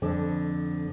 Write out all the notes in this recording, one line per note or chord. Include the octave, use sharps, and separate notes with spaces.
F2 D3